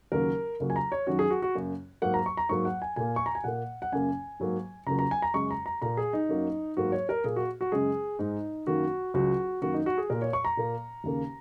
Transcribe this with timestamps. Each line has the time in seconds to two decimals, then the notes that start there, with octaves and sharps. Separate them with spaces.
0.12 D#2 C#3 F#3 A#3 A#4
0.60 C#2 C#3 F#3 A#3
0.70 G#5
0.76 A#5
0.92 C#5
1.07 F#2 D#3 F#3 F#4
1.19 G#4
1.30 F#4
1.42 F#4
1.55 F#2 C#3 A#3
2.02 G#2 F#3 A#3 F#5
2.14 A#5
2.26 C#6
2.37 A#5
2.49 G#2 F#3 A#3 C#6
2.65 F#5
2.82 G#5
2.96 A#2 A#3 G#5
3.16 C#6
3.26 A#5
3.35 G#5
3.44 A#2 A#3 F#5
3.82 F#5
3.92 F#2 C#3 A#3 G#5
4.40 G#2 F#3 A#3
4.87 C#2 C#3 F#3 A#3 A#5
4.99 A#5
5.11 G#5
5.22 A#5
5.34 F#2 C#3 G#3 C#6
5.51 A#5
5.66 A#5
5.82 A#2 A#3 A#5
5.97 G#4
6.13 D#4
6.29 F#2 F#3 A#3
6.77 G#2 F#3 A#3 F#4
6.92 C#5
7.09 A#4
7.24 A#2 A#3 G#4
7.36 F#4
7.61 F#4
7.72 F#2 C#3 G#3 G#4
8.19 G#2 G#3 D#4
8.67 F#2 D#3 A#3 F#4
9.14 C#2 C#3 F#3 F#4
9.61 F#2 D#3 F#3 A#3 F#4
9.74 D#4
9.86 F#4
9.98 G#4
10.10 A#2 A#3 A#4
10.22 C#5
10.33 C#6
10.45 A#5
10.57 A#2 A#3
11.04 D#2 C#3 A#3